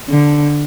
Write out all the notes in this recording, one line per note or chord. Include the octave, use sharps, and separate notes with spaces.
D3